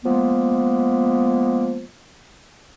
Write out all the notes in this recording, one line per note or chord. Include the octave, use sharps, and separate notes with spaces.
F3 G#3 A#3 B3